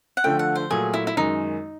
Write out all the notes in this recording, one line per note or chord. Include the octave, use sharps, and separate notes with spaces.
F#5
D3 F3 A3 G5
F#5
C5
A#2 F#3 A3 G#4
E4
E4
F#2 D#3 G#3 D#4